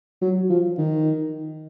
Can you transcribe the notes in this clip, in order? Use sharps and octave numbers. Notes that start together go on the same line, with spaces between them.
F#3
F3
D#3